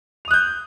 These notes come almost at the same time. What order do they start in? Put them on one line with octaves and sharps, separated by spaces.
F7 D#6 F#6 G6